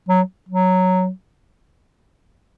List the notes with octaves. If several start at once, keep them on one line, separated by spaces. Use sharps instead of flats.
F#3
F#3